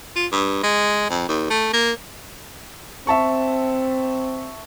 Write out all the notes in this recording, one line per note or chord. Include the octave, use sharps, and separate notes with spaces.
F4
G2
G#3
F2
D#2
A3
A#3
C4 E5 A5 C#6